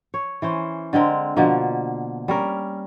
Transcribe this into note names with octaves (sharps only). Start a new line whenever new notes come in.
C#5
E3 C#4 C5
D3 G#3 C4 A#4
B2 D3 F3 A#3
G3 C#4 A#4